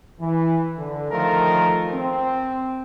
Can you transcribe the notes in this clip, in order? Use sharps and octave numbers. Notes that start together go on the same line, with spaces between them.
E3
D3
D#3 F3 A3 F4 A#4
C4